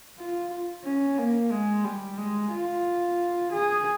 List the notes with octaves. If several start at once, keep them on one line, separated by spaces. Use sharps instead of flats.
F4
C#4
A#3
G#3
G3
G#3
F4
G#4